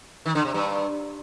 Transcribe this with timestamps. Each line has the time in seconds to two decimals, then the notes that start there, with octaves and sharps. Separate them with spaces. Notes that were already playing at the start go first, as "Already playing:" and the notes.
0.26 D#3
0.35 D3
0.45 C3
0.54 G2